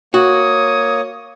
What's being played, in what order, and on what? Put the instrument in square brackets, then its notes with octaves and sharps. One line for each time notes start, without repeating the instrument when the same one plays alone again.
[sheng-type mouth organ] A#3 C#5 [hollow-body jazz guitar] F#4 [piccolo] D#6